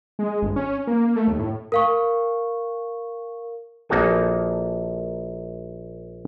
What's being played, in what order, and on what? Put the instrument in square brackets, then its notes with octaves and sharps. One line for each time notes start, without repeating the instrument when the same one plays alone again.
[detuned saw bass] G#3
G1
C#4
A#3
A3
D#2
A2
[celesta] A#4 F5 C#6
[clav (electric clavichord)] A#1 A#3 D#4 F#4 A4 G#5